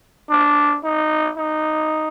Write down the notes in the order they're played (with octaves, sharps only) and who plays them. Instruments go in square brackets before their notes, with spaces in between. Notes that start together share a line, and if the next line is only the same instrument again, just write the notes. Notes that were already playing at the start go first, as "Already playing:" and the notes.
[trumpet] D4
D#4
D#4